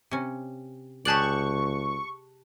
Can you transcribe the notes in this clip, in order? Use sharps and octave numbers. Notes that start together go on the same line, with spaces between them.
C3 C#4
C#2 G4 G#4 D5 A5 C#6 F#6 F#7